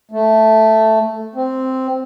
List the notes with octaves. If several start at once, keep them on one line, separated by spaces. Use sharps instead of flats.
A3
C4